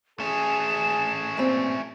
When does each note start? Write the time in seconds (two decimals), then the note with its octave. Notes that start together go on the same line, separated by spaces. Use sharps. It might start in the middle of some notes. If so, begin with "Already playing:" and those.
0.20 A3 C#4 G#4 E7
1.37 G2 A#2 C4